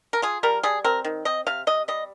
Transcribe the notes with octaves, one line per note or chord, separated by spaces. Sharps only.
A#4
F4 G#4
G3 A#4
G3 G#4
C4 A#4
D#3
C4 D#5
C3 F5
C3 D#5
G3 D#5